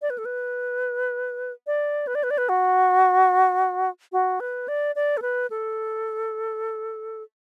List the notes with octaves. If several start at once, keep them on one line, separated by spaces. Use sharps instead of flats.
D5
B4
A4
B4
D5
B4
D5
B4
D5
B4
F#4
F#4
B4
D5
D5
A4
B4
A4